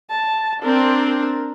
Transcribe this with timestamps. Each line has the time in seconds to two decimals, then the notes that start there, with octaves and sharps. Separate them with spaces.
0.10 A5
0.62 C4 D4 A#4
1.07 A#4